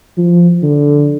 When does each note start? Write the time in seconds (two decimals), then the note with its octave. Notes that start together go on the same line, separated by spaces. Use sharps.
0.18 F3
0.63 D3